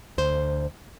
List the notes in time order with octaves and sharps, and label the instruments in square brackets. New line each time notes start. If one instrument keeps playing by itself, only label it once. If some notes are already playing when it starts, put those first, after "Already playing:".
[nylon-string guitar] D2 C5